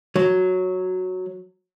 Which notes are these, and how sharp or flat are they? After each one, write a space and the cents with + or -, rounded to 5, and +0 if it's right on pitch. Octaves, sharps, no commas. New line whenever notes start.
F#3 -5